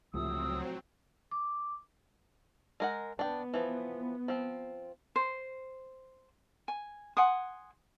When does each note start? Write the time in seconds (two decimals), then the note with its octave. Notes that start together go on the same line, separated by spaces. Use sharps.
0.14 C#2 A2 C3 F3 F#3 C4 D#6 E6
1.31 D6
2.80 G#3 A#4 F#5
3.19 B3 D4 G5
3.54 E3 F3
4.28 F3 C4
5.16 C5
6.68 G#5
7.17 F#5 G#5 C6 D#6